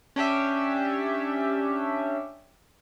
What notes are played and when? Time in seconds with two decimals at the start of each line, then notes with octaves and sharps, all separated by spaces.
0.16 C#4 D4 G4 E5